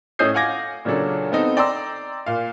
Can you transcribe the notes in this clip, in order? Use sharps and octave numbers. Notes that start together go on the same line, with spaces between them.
A2 C#4 D#5 D#6 G6 C7
F5 F#5 G#5 D6 G#6 A#6
A#2 C#3 F#3 C#4 D4 A4
B3 C4 D#4 A4
D5 G5 A#5 C6 E6 A#6
A#2 F5